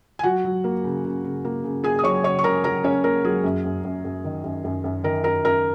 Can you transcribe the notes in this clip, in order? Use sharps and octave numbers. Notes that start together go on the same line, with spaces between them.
G#5
F#3 F#4 F#5
F#3
A#3
C#3
C#3
C#3
A#3
C#3
A#3 G#4 G#5
D#6
F#3 C#5 C#6
C#3 C#5 C#6
C#6
C#3 A#4 A#5
F#3 A#4 A#5
C#3 C#4 C#5
A#3 A#4
F#3 G#4
F#2
F#2
F#2
F#2
D#3
F#2
F#2
F#2
D#3 A#4
F#2 A#4
F#2 A#4